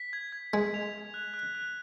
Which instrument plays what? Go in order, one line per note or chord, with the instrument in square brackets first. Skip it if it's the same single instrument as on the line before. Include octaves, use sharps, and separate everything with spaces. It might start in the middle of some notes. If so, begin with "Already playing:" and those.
Already playing: [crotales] B6
G#6
G#6
[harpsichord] G#3 [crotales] G#6
[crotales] F7
G#6
F#6
F#6
F#6